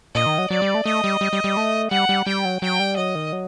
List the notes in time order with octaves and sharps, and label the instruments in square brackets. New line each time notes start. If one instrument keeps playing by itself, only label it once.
[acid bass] A#2 [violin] D#5
[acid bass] D#3
F#3
[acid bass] F#3 [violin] D5
[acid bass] G3
A3
[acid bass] A3 [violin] D#5
[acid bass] G3
G3
G3
G3
A3
[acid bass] G3 [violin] F#5
[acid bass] G3
[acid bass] G3 [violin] G5
[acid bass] F#3
[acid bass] F#3 [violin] G5
[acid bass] G3
[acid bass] F#3 [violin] D#5
[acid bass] D#3
F#3